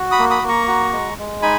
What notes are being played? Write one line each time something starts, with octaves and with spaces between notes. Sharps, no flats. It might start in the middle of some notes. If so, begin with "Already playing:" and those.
Already playing: F#4
B5 D#6
A#3
B5 D#6
A#3
A#5 C#6
F#4
G#3
G#3
D#4 G#5 B5